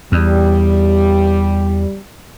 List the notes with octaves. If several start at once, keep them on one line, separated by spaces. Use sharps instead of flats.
E2 G3